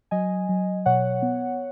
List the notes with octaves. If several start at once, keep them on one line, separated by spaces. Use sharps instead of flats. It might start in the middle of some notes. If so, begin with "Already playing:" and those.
F#3 D#5 G#5
F#3
B2 C#5 F#5
B3